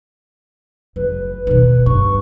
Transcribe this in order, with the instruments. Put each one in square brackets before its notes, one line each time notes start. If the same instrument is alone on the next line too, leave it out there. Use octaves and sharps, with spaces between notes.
[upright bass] F#1 [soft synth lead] B4
[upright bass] B2 D#3
[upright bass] G2 [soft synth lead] C#6